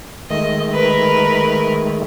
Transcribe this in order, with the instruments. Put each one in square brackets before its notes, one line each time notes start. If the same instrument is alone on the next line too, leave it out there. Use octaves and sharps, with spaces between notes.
[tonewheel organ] D#3 G#3 A3 [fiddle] D#5
[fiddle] A#4 B4